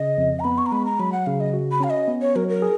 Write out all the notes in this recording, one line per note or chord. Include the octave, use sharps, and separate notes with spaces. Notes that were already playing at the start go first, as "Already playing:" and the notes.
Already playing: C#3 D#5
F2
A#5
B3 B5
C#6
A#5
G#3 B5
A#5
F#3 B5
F#5
C#3 F5
D#5
F#4
B5
C#4 F5
D#5
B3
C#5
F#3 A#4
A#4
G#4